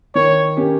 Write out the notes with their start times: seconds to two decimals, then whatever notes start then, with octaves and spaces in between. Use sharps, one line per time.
0.15 D#3 C#5
0.57 A#3 C#4 G4